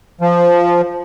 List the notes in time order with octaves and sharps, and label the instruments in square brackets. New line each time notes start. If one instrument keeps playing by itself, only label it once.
[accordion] F3